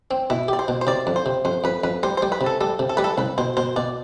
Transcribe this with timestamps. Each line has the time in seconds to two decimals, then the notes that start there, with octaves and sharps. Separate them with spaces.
0.11 C4
0.30 B2 E4
0.48 G4 D5
0.59 C5
0.68 B2
0.81 C5
0.87 C3 D5
1.07 F2
1.16 C5
1.26 C3
1.45 F2 C5
1.64 F2 B4
1.84 F2 B4
2.03 G3 C5
2.17 C5
2.22 G3
2.32 B4
2.41 C3
2.46 A4
2.61 G3 A4
2.79 C3
2.89 A4
2.97 G3 B4
3.04 A4
3.18 C2 B4
3.38 B2 C5
3.57 B2 C5
3.76 B2 D5